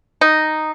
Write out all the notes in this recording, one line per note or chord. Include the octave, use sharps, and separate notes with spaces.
D#4